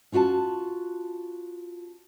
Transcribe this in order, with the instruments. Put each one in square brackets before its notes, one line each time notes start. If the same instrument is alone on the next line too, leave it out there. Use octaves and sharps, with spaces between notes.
[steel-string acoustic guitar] C#4 F4 F#4 G#5 A5